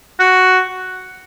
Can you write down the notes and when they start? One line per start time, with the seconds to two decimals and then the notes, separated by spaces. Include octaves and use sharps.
0.20 F#4